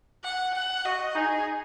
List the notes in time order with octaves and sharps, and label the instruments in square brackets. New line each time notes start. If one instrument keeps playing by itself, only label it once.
[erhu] F#5
F#5
[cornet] F#4 [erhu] D#5
[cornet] D#4 [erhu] G#4